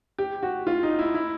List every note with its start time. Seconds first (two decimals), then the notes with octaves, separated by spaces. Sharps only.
0.18 G4
0.43 F#4
0.67 F4
0.83 D#4
0.99 E4
1.14 E4